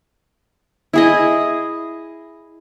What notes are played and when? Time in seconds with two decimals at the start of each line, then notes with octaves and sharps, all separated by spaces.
0.93 E4 G#4 D#5